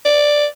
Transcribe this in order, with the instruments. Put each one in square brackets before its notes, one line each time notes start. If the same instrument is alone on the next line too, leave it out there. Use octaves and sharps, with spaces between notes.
[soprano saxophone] D5